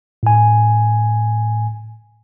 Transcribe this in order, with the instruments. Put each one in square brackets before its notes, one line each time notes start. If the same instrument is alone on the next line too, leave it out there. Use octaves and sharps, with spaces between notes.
[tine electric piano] A2 G#5